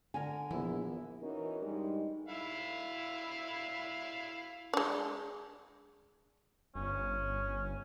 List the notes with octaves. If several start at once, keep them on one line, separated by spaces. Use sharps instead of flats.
D3 A#4 G#5
A#1 E3 B3 E4
E3 C#4 D#4 F#4 A#4
G2 G3 G#3 D#4
E4 E5 F5
G#3 D4
G1 C#4